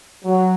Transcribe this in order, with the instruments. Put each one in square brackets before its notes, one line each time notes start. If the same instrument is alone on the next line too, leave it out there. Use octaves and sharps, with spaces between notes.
[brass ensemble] F#3